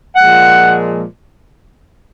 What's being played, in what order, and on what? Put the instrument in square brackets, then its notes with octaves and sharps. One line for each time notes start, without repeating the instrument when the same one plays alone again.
[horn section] A#2 F3 G#3 F#5